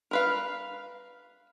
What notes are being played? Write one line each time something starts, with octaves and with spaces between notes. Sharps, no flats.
A#4 B4 F5